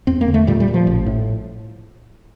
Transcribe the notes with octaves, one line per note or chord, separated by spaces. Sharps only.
E2 C4
A#3
D3
A3
A#2 G3
G3
A#2
F3
A1
A2